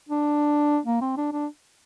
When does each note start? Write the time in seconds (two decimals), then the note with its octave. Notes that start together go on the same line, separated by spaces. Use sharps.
0.09 D4
0.86 A#3
1.01 C4
1.17 D4
1.33 D4